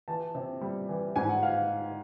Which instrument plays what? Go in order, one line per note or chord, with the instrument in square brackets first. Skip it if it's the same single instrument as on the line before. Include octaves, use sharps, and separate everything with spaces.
[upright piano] E3 A5
C3
G3
E3
G#2 G#5
F#5
F5